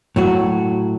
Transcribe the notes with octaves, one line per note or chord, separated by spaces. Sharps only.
A2 F#3 F#4